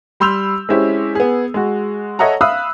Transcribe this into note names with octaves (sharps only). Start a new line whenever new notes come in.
G3 B5 C6 E6 G6 F7
G#3 C4 C#4 E4 G4
B3 G#4
G#3 F#4
A4 C#5 D#5 E5 F#5 A#5
E5 F5 B5 D#6 E6 F#6